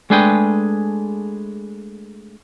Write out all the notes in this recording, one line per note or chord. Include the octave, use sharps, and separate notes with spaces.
G#3 A3 D4 G#4 B4 G5